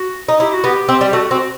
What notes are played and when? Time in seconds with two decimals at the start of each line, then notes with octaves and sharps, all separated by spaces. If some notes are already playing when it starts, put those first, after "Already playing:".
Already playing: F#4
0.28 D#4
0.40 E4 G4
0.53 F#4
0.64 B3 G4
0.89 C4
1.01 G3
1.08 G4
1.13 A3 F#4
1.31 C4 F#4